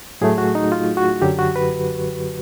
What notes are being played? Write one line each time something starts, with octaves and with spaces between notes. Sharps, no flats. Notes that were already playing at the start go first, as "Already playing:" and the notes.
A2 F#3 A3 G#4
F#4
D#4
F4
F#4
F#2 D3 F#3 G4
F#4
B4